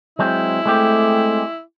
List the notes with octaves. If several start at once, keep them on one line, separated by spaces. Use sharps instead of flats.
F#3 G#3 C4 E4
G#3 A3 C4 G4